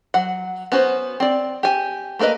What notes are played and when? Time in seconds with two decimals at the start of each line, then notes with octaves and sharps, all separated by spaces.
0.14 F#3 F#5
0.72 B3 C#4 F#4 C5
1.20 C4 D5
1.63 G4 G#5
2.19 A3 A#3 A#4 B4 D#5